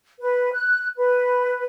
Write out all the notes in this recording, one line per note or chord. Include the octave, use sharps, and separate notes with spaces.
B4
F#6
B4